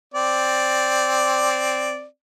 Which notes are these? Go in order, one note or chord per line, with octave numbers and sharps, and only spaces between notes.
C4 D5